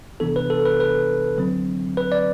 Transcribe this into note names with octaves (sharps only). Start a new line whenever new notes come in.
C3 E3 B3 D4 A4
B4
A4
B4
B4
D3 F#3 C4
B4
D5